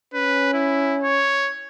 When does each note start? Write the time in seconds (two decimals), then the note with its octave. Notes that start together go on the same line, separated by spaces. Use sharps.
0.14 C#4 B4
0.54 E4
1.03 C#5